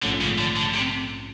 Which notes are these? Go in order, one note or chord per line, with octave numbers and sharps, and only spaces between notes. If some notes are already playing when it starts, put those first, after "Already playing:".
A#1 G#2 D3 F3 A3 C#4
C#3
D3
D3
C3